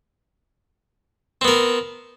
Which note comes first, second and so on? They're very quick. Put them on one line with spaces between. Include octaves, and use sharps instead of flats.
C4 B3 A#4